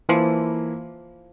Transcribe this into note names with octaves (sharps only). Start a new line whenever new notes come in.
E3 F3 A#3 E4